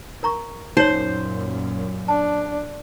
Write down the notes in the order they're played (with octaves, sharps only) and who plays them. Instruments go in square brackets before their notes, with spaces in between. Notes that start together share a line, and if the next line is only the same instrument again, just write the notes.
[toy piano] A#4 A#5 C#6
[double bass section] F#2 A#2 [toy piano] D#4 C#5 [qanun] C5
[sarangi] D4 [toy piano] A5